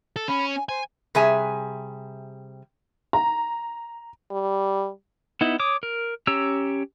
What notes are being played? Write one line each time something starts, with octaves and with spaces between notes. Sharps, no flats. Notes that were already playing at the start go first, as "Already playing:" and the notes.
A4
C#4 B5
G#5
C5 G#5
C3 G3 G#4 E5 G#5
A#5
G3
B3 D#4 E4
C#5 D6 D#6
A#4
C#4 G4 C#5 A#5 E6